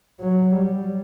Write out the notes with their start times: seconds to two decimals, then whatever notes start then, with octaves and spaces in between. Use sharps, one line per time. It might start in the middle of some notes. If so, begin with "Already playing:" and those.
0.20 F#3
0.52 G3